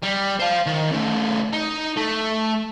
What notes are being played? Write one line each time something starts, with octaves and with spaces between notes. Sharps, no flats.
G3
C5 F5
D#3
C#3 A3
D#4
A3